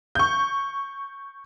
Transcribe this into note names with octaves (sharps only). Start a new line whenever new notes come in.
C#6 G6